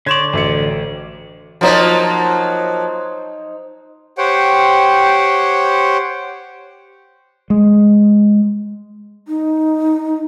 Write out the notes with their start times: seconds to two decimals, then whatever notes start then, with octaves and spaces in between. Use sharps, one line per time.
0.06 D3 C#5 D5 C6 C#6 G#6 E7
0.33 A1 D2 E5 C#7
1.61 F3 F#3 A#3 D#4 C5
4.18 G4 C5 C#5 F#5 G5
7.50 G#3
9.28 D#4